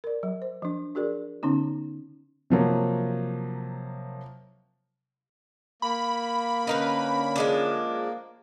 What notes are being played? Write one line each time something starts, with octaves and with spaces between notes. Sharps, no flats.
A#4 D5
F#3
C5
F3 D4
D4 F#4 G#4 A#4 D5
D3 B3 C#4 D#4
C3 F3 F#3 A#3
A#3 B5
D3 C#4 D#4 A#4 B4
F3 G#3 D4